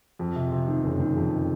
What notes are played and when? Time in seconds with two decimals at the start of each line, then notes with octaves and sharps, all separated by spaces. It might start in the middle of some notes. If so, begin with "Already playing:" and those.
0.19 F2
0.35 C3
0.51 C3
0.68 D#3
0.84 F#1
1.00 D#3
1.16 F2